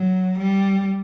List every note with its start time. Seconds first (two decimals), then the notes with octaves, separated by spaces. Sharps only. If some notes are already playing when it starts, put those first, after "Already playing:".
Already playing: F#3
0.38 G3